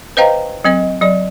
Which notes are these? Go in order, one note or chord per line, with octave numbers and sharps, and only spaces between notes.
B4 C5 D#5 F5 G5 A#5
F#3 C4 D#5
F#3 D5